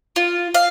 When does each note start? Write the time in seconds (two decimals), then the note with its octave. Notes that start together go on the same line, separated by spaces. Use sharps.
0.16 F4
0.54 F5